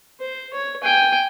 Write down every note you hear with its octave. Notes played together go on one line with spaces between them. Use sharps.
C5
C#5
G5 G#5